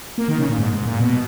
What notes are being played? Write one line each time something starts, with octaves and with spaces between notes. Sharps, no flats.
A#3
D#3
C#3
A#2
G#2
G#2
A#2
B2